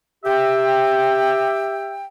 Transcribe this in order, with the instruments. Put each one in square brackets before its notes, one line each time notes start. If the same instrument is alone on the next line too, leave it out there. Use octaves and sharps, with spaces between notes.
[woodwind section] G4 E5 G5